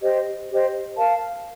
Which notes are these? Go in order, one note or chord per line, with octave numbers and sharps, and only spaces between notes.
G4 C5 D#5
G4 C5 D#5
A#4 F5 A5